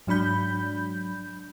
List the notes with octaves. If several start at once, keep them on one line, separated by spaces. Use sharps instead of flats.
G#2 F#3 D4 B5 G6